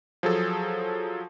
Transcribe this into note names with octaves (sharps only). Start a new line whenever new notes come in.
F3 F#3 G#4 A4